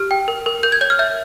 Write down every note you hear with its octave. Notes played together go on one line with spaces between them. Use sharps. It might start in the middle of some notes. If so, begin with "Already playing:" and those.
Already playing: G4 F6
G5
A#4
A#4
A#4 G6
G#6
C#5 G6
F6
E5 G6